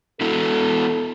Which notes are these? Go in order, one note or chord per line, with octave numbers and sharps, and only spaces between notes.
B3 E4 F#4 A4